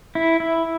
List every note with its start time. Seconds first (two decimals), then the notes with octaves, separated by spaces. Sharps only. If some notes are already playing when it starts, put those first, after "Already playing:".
0.15 E4
0.40 E4